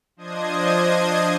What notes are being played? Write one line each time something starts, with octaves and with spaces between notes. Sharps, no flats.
F3 D4 C5 D#5 D#6 G#6